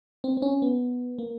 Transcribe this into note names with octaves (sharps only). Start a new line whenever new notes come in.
C4
C4
C#4
B3
A#3